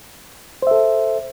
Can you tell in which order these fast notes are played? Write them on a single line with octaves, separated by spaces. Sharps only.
C5 E5 A4